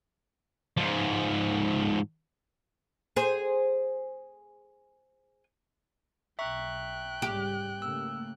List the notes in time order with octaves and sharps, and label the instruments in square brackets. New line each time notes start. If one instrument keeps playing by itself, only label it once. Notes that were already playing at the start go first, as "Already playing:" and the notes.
[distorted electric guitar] G#2 F3
[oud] G#4 C5
[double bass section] B1 [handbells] E5 A#5 C#6 [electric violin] G5 F#6
[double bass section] G#2 C#3 G3 [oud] G4
[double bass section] C#3 A3 A#3 [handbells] E6